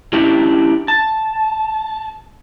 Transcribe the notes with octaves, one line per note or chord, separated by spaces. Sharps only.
C#4 D4 E4 G4
A5